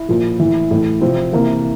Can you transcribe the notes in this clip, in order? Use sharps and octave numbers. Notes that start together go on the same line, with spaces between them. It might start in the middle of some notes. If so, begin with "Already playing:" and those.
Already playing: E4
A#2 F3
A2 E3
A2 E3
C3 F3 C4
C3 E3 A#3